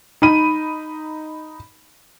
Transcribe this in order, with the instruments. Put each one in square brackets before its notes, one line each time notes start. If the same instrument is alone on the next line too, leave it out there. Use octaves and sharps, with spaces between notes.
[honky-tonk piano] D#4 B5 D#7